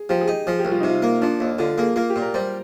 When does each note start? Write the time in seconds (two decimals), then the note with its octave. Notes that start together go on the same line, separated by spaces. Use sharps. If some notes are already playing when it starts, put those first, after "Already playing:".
Already playing: G#4
0.09 F3 G4
0.21 G#4
0.28 D#4 G4
0.47 F3 G#4
0.59 G4
0.65 C2
0.72 F4
0.80 C3 D#4
0.90 F4
1.03 A#3
1.21 F3 D4
1.40 D#2
1.59 D3 F4
1.78 A#3 G#4
1.96 A#3 F4
2.10 G4
2.16 A#2
2.22 A#4
2.34 G3 C5